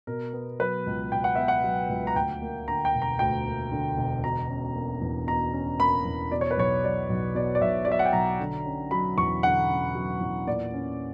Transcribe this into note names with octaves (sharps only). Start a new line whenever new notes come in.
B2 A#4
B3
F#3 B4
C#2
B2 G5
F#5
B3 E5
F#5
F#3
C#2
A#5
D2 G5
A#3
D3 A#5
G5
E1
A#5
D2 G5
A#3
D3
E1
B2 A#5
C#4
A#3
E2
B2 A#5
C#4
A#3 B5
E2
B2 D5
C#5
B4
B1 C#5
F#3 D5
B1
B2 D5
D5
B1 E5
D5
F#3 E5
F#5
G5
B1 A#5
D3
C#4
F#3 B5
E2 C#6
D3 F#5
C#4
F#3
E2
A#2 D5
C#4